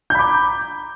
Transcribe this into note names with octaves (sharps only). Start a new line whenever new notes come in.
A#5 B5 D6 G6